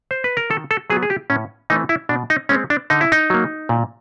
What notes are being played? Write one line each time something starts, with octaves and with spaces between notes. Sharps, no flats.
C5
B4
A#4
D#3 A4
A4
F#3 B3 G#4
G#4
G4
A2 C#4
E3 A3 C4 D#4
E4
B2 D4
D#4
G#3 C4 C#4
D4
D3 D#4
E4
D#4
F#3 A#3
A#2